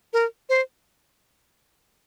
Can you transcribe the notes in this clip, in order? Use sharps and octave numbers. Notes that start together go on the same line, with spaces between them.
A#4
C5